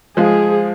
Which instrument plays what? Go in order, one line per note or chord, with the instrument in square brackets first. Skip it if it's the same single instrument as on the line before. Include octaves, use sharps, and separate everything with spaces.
[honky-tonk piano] F3 G#3 [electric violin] G#4